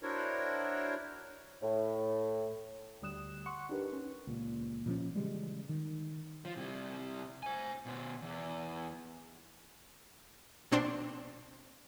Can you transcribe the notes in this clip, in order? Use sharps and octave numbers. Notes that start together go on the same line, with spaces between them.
D4 E4 F#4 A#4 C5 C#5
A2
D2 D3 G3 D#6 F#6 E7
F#5 C6 C#6 F#6 C#7
D4 D#4 G4 A#4 B4
C#4
C#2 A#2
A#2 F3 C#4
C#3 E3 G3 G#3
D#3
F3
C3 G3
C5 G#5
B2 C5
E2
A#1 B2 C4 D4 C6